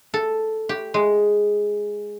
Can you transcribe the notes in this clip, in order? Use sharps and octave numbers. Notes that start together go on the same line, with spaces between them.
A4
G4
G#3